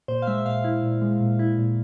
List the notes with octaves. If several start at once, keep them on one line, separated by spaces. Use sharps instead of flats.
A#2 C5
F5
G#3 E5
E5
A#2 F5
E4
A#2
G#3
A#2
E4
A#2